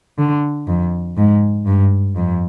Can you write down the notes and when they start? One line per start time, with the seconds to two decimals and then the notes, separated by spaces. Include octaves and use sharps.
0.18 D3
0.67 F2
1.17 G#2
1.66 G2
2.16 F2